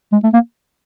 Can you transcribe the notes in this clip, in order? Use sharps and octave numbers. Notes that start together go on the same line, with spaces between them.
G#3
A3
A#3